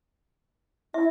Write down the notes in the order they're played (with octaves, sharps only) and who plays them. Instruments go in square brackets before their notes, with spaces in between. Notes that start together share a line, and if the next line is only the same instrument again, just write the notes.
[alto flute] E4 [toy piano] E5